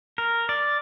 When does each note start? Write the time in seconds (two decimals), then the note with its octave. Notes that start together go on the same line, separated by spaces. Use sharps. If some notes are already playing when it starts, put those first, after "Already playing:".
0.18 A#4
0.49 D5